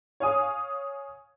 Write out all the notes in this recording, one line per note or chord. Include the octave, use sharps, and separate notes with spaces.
C#5 F5 G#5 D#6